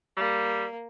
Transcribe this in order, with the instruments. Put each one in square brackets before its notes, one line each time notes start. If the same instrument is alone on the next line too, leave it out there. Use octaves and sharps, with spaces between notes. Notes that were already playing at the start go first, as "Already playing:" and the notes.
[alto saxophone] G3 [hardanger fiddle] A#3